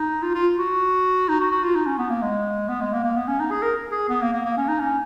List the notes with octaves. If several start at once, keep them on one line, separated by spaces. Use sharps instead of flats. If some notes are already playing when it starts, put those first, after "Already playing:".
Already playing: D#4
F4
F4
F#4
D#4
F#4
F#4
F4
D#4
C#4
B3
A#3
G#3
B3
G#3
A#3
A#3
B3
C#4
D#4
G#4
A#4
G#4
B3
A#3
A#3
A#3
C#4
D#4
C#4